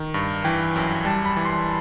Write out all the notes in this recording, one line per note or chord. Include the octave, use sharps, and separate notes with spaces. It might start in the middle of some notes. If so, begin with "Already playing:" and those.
Already playing: D#3
G2
E3 G5
F#2
G3 A5
B5
E3
C6